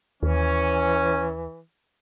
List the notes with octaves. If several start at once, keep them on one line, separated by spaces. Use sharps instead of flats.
D#2 E3 C#4